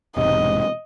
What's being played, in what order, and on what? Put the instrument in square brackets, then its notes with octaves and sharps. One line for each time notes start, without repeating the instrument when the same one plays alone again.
[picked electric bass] E1 G#2 C3 [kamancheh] D#5